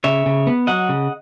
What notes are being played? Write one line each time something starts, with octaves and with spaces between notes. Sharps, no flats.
C#3 C#5 E5
C#3
B3
F#3 D#5 F#5
C#3